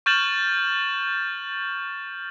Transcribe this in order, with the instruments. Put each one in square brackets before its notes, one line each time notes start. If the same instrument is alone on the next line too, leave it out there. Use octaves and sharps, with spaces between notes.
[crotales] C#6 F6 G6 A6 E7 F#7